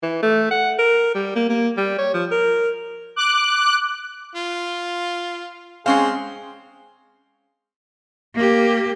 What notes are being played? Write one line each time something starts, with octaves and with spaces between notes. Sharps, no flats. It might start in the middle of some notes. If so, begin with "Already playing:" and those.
E3
A3
F#5
A#4
G3
A#3
A#3
G3
C#5
F3
A#4
D6 F#6
F4
G#3 C4 C#4 G#4 F5
A#3 G4